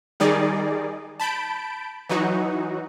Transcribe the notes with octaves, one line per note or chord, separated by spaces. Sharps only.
D#3 G3 D#4 G#4 D5
A5 B5 G6 D7
E3 F#3 D#4 F#4